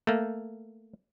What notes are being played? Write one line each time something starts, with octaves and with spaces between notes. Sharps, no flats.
A3 A#3